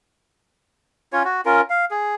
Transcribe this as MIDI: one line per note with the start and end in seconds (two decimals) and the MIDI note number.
1.13 1.23 61
1.13 1.23 65
1.13 1.23 73
1.25 1.41 66
1.45 1.61 61
1.45 1.61 65
1.45 1.61 70
1.70 1.85 77
1.91 2.15 68